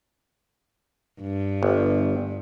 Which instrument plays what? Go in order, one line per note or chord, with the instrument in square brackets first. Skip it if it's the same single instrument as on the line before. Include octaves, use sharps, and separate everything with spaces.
[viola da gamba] G2
[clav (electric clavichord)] G1